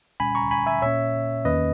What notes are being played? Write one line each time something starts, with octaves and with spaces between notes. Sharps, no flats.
A#2 G3 C#4 G#5 B5
A#5 C#6
G#5 B5
E5 G#5
A#2 A#3 C#4 C#5 E5
E2 D#3 A#3 C#4 B4 D#5